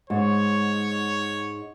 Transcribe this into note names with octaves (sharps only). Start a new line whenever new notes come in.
G#2 C#5